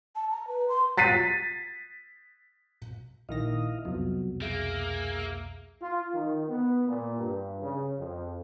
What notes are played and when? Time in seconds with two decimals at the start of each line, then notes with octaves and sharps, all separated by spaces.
0.15 A5
0.30 A#5
0.47 B4
0.69 C6
0.98 A6 B6 C7 D#7
3.29 A#1 D#3 E4 D#5 F5 A#6
3.85 C2 F2 B2 F#3
4.42 A#3 G#4 E5 F5
5.81 F4
6.15 D#3
6.48 B3
6.88 A#2
7.18 G2
7.62 C#3
7.98 F2